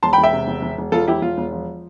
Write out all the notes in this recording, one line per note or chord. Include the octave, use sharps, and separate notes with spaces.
E1 A5 C6
G5 B5
E1
E5 G5
C3
E1
E1
E1
E1 F4 A4
E1 E4 G4
E1 F4
E1
F3